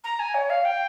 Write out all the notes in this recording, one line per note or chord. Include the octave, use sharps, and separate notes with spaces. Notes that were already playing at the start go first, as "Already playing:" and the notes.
A#5
G#5
C#5
F5
G5